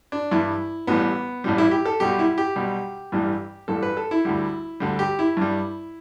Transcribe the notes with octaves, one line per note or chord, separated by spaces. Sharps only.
D4
G2 E3 G3 E4
A1 A2 E3 G3 B3
A1 A2 E3 G3
E4
G4
A4
B1 B2 G3 G4
E4
G4
B1 B2 G3
A1 G2 E3 G3
A1 G2 E3 G3 A4
B4
A4
E4
D2 D3 G3
D2 D3 G3
G4
E4
G2 G3